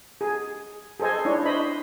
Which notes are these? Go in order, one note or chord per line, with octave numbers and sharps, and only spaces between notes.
G#4
G#4 A4 C5 D#5 G#5
D4 E4 C#5
C5 D#5 B5